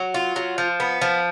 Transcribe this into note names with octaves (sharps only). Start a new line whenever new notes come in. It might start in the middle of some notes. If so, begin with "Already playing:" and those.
Already playing: F#3
F4
F#3
F3
B3
F3